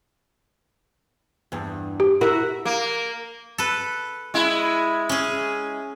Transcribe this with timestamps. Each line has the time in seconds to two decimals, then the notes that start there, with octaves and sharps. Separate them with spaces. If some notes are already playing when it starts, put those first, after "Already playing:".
1.52 E2 G2
2.00 G4
2.21 E4 F#4 A#4
2.65 A#3
3.58 A4 B4
4.34 G#3 E4
5.09 C#4 G#4